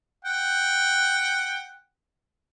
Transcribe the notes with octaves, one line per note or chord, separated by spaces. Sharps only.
F#5 G5